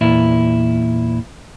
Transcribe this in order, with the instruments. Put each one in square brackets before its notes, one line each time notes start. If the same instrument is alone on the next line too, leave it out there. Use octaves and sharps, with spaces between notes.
[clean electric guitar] E2 A#2 E4